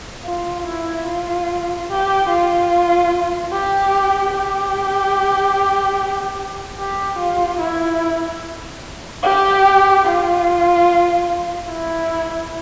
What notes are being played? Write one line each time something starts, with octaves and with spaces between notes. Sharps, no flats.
F4
E4
F4
G4
F4
G4
G4
G4
F4
E4
G4
F4
E4